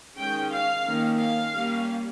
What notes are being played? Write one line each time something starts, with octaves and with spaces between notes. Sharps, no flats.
D#3 G#3 C#4 G5
F5
D#3 A#3 C#4
F5
G3 A#3 C#4